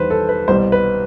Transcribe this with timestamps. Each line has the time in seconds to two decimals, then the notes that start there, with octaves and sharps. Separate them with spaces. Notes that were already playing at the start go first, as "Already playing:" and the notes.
Already playing: E2 D#3 G3 B4 C5
0.10 A4
0.29 B4
0.48 C2 B2 G3 C5
0.72 B4